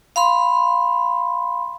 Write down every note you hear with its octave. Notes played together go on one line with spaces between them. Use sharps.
F5 B5 C6